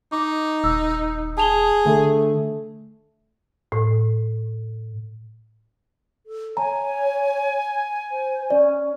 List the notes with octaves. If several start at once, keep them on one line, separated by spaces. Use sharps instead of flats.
D#4 D6
D#1 E6
G#4 A5 F7 G7
D3 A3
A2
A4
C#5 G#5 A#5
C5
C#4 D5